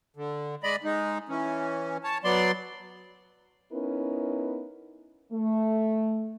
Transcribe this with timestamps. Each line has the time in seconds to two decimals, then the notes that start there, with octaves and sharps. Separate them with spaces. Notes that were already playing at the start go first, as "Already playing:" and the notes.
0.16 D3
0.63 G#3 D5 D#5 B5
0.84 G#3 D#4
1.29 E3 C#4
2.04 C#5 A5
2.24 F#3 B3 D5 C6
3.72 B3 C#4 D#4 E4 A#4 B4
5.32 A3